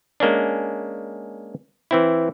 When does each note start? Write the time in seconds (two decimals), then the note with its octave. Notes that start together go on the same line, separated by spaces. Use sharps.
0.20 G#3 A#3 C#4 D4
1.91 E3 C4 E4